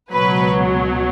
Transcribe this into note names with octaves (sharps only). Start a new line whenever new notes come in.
C#2 B2 F#3 B4